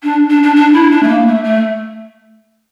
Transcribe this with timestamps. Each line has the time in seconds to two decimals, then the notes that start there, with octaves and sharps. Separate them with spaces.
0.03 D4
0.30 D4
0.43 D4
0.56 D4
0.73 E4
0.91 D4
1.03 A3
1.08 A#3
1.26 A3
1.44 A3